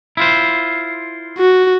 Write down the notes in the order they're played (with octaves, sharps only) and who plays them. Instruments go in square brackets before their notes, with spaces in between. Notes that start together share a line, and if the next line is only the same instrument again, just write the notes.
[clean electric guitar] E4 F4 C5
[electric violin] F#4